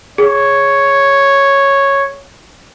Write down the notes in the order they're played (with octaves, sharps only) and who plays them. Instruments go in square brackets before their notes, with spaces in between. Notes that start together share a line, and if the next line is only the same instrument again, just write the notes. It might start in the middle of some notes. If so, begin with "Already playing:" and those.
[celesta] G#4 [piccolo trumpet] C#5